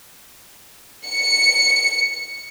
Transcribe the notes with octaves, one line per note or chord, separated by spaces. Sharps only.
C#7